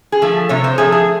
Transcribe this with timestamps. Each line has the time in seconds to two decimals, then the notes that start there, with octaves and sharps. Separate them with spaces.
0.12 G#4
0.22 F3 A3
0.49 C3 C#5
0.64 C5
0.78 F3 A3 G#4
0.92 G#4